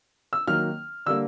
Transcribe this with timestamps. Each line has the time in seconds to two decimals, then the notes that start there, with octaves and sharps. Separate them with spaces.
0.33 E6
0.47 D#3 F#3 A#3 F6
1.06 D3 G3 A#3 E6